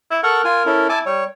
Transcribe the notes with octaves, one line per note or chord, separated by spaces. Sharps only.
E4
A4 A#4 F#5 C#6
F4 G#5
C#4 E4 A4
E4 G#5 A5 D6
G3 C#5